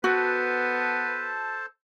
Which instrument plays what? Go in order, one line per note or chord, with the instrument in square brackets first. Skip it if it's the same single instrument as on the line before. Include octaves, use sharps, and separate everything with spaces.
[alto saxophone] B3 [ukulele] F#4 [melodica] A4 C5 A5 [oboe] B4